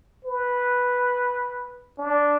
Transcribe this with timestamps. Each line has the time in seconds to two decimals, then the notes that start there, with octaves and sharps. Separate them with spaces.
0.25 B4
1.98 D4